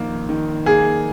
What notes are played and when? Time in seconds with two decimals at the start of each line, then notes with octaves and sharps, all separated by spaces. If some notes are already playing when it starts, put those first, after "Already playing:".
Already playing: A#1 D#3 A#3
0.29 D#3
0.66 A#3 G#4